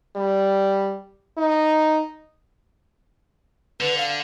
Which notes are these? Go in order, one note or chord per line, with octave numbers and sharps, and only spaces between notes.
G3
D#4
D3 B4
F5